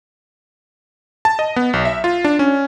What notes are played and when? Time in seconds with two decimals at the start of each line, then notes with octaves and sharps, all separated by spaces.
1.25 A5
1.39 D#5
1.56 B3
1.73 B1
1.85 E5
2.04 F4
2.24 D4
2.39 C#4